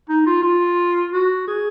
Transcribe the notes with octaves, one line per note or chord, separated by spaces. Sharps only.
D#4
F4
F4
F#4
G#4